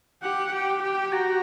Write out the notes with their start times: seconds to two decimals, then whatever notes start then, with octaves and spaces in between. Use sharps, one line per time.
0.22 G4 F#5
0.47 F#5
0.53 G4 G5
0.83 G4 G5
1.07 G5
1.12 F#4 A#5